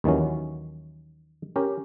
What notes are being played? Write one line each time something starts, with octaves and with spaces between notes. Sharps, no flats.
D#2 D#3 E3 F#3 C#4
C#4 G4 A#4